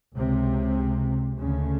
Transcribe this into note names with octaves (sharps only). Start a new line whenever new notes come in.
C#2 C3
D2 C#3